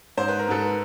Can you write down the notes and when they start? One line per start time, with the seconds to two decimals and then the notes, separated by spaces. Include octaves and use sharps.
0.17 G#2 C5
0.28 B4
0.39 A#4
0.49 G#2 A4 B4